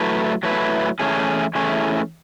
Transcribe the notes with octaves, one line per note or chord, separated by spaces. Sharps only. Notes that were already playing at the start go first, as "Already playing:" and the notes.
Already playing: F#3 A3 E4 B4
F#3 A3 E4 B4
E3 A3 C#4 E4 G#4
E3 A3 C#4 E4 G#4